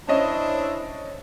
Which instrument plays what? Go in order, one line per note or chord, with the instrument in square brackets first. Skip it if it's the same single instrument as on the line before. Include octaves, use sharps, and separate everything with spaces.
[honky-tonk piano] C#4 D#5 [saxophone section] D4 E4 C5